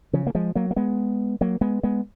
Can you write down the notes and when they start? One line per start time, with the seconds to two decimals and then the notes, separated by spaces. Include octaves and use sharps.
0.13 C#3 F3
0.27 A#3
0.35 F3 G#3
0.55 F#3 A#3
0.71 A#3
0.76 G#3 B3
1.41 F#3 A#3
1.61 G#3 B3
1.83 G#3 B3